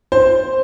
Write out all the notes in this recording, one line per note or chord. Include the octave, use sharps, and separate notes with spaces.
C5